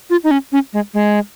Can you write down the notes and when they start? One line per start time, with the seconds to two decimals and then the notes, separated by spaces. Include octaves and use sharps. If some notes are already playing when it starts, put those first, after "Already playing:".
0.10 F4
0.24 D#4
0.31 C#4
0.52 C#4
0.73 G#3
0.94 G#3